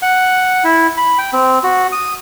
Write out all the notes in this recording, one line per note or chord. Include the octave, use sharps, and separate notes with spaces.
F#5
E4
B5
G5
C4
F#4
D#6